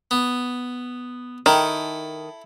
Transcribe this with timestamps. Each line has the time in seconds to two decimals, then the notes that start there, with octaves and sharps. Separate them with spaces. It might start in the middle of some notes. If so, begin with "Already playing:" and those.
0.11 B3
1.46 D#3 E4 A4